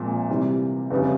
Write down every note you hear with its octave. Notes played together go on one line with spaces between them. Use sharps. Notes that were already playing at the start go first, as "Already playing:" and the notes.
Already playing: A#1 A#2 G#3 C4
C3 E3 G3
G1 F2 C#3 G3